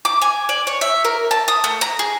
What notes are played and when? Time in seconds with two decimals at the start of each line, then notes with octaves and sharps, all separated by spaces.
0.05 D6
0.22 G#5
0.49 D5
0.67 C#5
0.81 E5
1.05 A#4
1.31 A5
1.48 D#6
1.64 A3
1.81 A#5
1.99 G#4